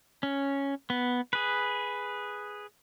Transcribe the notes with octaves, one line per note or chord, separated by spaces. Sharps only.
C#4
B3
G#4 B4